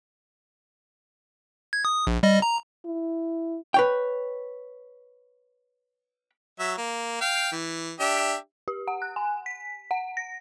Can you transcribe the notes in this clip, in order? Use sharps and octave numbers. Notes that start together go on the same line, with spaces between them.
G#6
D#6
A#1
G3 D#5
A#5
E4
B4 C#5 G5
F#3 E5
A#3
F5 G5
E3
D4 G4 E5
G4
F#5
F#6
G#5
B6
F#5
A#6